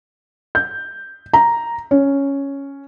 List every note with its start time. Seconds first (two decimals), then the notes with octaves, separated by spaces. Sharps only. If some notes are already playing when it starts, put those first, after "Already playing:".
0.55 G6
1.33 A#5
1.91 C#4